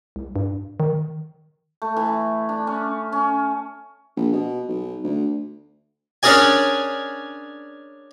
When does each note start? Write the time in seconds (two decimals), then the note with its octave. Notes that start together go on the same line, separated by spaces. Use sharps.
0.16 C2
0.36 G2
0.80 D#3
1.82 A3
1.96 E3
2.49 D4
2.67 C#4
3.12 C#4
4.17 A#1
4.32 B2
4.68 B1
5.03 D2
6.23 C#4 D4 G#4 A#4 D5 G#5